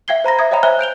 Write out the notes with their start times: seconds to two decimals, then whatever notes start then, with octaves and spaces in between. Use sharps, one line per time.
0.08 E5 F5 G5 G#6 C7 G7
0.24 C5 A#5 B5 A#6
0.39 E5 D#6 G#6
0.51 C#5 D#5 F5 G5 A#5 B5
0.63 C5 E5 G#5 F6 F#6 G7
0.79 G6 D7 F7 G7